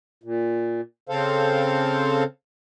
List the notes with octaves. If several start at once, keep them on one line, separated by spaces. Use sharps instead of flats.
A#2
C#3 C4 A4 C5 F5